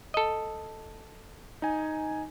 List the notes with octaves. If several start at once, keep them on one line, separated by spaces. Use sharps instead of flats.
A4 D#5
D#4 G#5